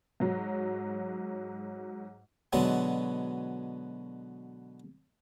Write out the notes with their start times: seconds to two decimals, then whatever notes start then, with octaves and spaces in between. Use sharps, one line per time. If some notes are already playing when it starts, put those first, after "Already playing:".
0.20 G#2 F#3
2.53 B2 D3 F#3 G#3 B3